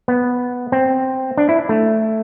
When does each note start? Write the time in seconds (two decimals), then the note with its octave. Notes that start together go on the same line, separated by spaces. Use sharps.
0.08 B3
0.72 C4
1.37 D4
1.49 E4
1.69 A3